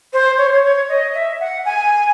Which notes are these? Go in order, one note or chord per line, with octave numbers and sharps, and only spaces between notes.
C5
C#5
C5
C#5
C#5
D#5
E5
F#5
G#5